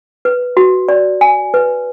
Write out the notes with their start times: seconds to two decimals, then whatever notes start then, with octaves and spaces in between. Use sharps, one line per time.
0.25 B4
0.57 F#4
0.89 D5
1.21 G#5
1.54 B4